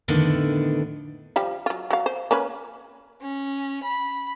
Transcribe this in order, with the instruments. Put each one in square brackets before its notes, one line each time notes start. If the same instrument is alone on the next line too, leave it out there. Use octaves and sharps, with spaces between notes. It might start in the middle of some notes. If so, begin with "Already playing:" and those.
[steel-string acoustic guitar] F2 A2 D3 D#3 B3 D4
[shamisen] F3 G3 F4
F#3 F4
F#3 F5
C5
A#3 C#4 B4
[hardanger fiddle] C#4
B5